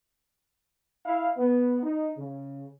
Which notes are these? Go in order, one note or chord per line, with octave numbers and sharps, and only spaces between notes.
E4 F5
B3
D#4
C#3